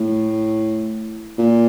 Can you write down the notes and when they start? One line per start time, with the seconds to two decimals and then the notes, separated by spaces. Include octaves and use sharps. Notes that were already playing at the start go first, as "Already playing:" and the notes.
Already playing: A2
1.38 A#2